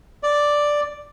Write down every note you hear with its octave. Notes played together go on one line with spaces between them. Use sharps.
D5